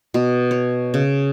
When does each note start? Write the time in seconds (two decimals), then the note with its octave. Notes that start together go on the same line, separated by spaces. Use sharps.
0.14 B2
0.51 C#5
0.94 C#3